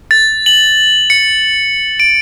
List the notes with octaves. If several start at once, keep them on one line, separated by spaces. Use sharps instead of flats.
A6
F#7
C#7
D7